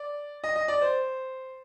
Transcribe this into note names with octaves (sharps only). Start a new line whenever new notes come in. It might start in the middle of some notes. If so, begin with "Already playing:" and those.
Already playing: D5
D#5
D#5
D5
C5